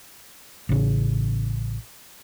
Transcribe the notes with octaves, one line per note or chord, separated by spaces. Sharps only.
A1 C#3